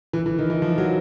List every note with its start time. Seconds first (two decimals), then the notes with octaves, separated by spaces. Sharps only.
0.13 E3
0.26 E3
0.39 D#3
0.50 E3
0.62 F3
0.78 F#3